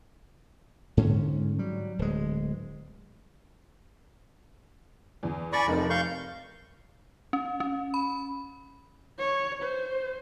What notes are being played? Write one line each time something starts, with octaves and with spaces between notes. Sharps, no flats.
G#2 D3 G#3 C#4
F#3 G3
D1 G#3
E2
D5 G#5 B5 C#6 A6 A#6
F1 F2 D#4 A#4
F5 C#6 G6
C#4
C#4
B5
C#5
C5